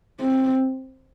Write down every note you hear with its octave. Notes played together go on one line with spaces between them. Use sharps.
C4